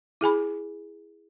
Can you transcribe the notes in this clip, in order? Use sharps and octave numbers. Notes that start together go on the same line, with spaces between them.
E4 G#4 G#5 B5